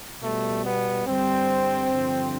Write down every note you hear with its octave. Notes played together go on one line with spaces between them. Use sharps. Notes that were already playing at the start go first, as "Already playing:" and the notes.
B2 G3 A3
B3
G2 D3 G3 C4
G2 D3 F3